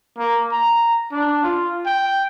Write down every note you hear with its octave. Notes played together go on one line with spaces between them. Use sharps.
A#3
A#5
D4
F4
G5